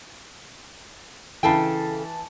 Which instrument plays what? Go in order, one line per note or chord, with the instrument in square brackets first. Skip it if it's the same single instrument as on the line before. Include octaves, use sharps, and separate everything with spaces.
[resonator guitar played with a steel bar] C#3 A4 G5 [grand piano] E3 A5